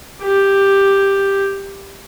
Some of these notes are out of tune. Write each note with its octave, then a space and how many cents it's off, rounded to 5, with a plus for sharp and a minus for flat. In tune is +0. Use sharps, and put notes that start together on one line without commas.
G4 +5